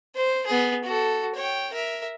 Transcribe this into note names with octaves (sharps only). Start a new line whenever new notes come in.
C5
B3 G#4
F#4 A4
C#5 G5
A#4 E5